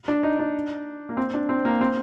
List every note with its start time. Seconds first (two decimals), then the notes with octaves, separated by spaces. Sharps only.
0.08 D4
0.23 D#4
0.39 D4
1.09 A#3
1.17 C4
1.34 D4
1.49 C4
1.65 A#3
1.81 C4